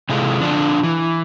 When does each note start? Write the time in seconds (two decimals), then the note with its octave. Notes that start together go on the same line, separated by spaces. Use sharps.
0.09 C3 E3 G#3 F4 A4
0.40 D3 F3 D4 F4
0.83 E3